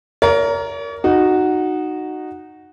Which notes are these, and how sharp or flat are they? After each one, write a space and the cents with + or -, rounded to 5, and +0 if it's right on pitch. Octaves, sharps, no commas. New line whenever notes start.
A#4 +0 C#5 +45
D#4 -15 F#4 +0